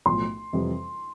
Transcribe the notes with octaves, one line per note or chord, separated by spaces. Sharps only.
B1 A2 F3 C6
F2 C3 E3 G3